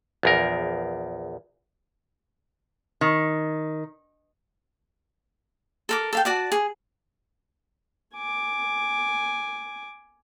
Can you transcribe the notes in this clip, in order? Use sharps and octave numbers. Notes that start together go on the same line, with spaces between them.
A#1 E2 A#4
D#3
A4 A#4 D6
A4 F5 G5
F#4 D5 A5
G#4
G#5 D6